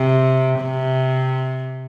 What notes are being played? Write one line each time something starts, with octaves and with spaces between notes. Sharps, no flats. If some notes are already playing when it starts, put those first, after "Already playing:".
Already playing: C3
C3